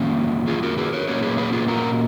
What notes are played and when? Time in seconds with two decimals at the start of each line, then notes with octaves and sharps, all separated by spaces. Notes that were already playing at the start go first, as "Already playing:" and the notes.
Already playing: F2 D#3 A#3 C#4
0.47 F4 G#4
0.63 F#4 A#4
0.78 G#4 B4
0.93 A#4 C#5
1.08 A#2 F#3 A#3 C#4 A#4 C#5
1.23 G#4 B4
1.38 G#4 B4
1.53 F4 G#4
1.68 F#4 A#4